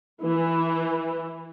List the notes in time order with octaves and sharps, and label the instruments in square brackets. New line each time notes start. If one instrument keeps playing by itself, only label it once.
[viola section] E3